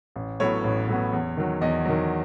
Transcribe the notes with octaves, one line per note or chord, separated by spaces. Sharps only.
A1
A2 F#3 B3 C#5
A1
A2 F#3 B3
E2
D#3 F#3
E2 D#5
D#3 F#3